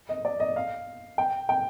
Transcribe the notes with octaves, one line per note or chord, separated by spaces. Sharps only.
D#5
D5
D#5
F5
G5
G5